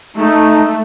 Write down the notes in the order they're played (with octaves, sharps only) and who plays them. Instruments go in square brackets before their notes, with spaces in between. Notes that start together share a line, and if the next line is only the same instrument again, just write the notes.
[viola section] A3 [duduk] D#4